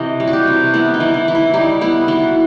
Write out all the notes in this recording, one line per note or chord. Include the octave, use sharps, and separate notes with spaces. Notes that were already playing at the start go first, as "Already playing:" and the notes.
Already playing: C3 E3 D#5
G3
F#4
G4
C3
B3 E4
D#4
E3
E4
E3
E4
G3 D#4
B3 E4
E3 F#4